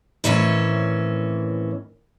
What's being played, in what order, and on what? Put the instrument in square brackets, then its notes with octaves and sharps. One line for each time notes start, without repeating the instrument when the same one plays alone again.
[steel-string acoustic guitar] A2 D#3 E3 C4 C#4 C#5